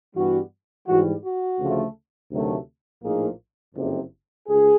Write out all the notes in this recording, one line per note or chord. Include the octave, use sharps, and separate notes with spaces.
G2 E3 G3 B3 F#4
G#2 E3 G3 F#4
F#4
D2 C#3 F3 A3
D2 C3 D#3 F#3 A3
A#1 A2 F3 A#3 D#4 G#4
F#1 F2 C3
C#2 G#4